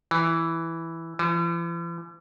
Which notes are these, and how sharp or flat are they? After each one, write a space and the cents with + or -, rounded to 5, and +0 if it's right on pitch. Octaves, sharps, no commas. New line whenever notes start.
E3 +0
E3 +45